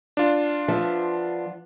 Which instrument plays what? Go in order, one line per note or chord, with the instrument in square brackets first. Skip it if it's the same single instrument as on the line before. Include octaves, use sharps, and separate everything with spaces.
[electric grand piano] D4 F4
[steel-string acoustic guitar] F3 B3 E5